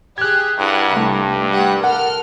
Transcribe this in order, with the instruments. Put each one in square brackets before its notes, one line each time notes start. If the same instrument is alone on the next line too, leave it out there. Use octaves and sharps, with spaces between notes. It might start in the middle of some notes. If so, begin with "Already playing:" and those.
[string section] G4 G#4 [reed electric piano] F#6 G#6
[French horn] G2 [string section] E4 A#4 F#5
[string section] C2 [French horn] G2 [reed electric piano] A3
[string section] G3 G4 F#5
[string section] A4 A#4 F6 [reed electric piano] F#5